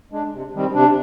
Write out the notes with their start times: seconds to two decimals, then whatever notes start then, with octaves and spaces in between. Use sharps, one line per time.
0.12 G#3 D4
0.33 C3
0.54 D#3 G3 C4
0.74 C3 D4